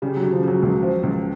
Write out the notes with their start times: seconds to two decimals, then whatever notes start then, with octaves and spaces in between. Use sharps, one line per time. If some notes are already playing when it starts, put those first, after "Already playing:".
0.02 C#3 G3
0.17 F#3
0.23 C#3
0.32 F3
0.43 C#3 F#3
0.62 C#2 F#3
0.83 F3
1.03 C#2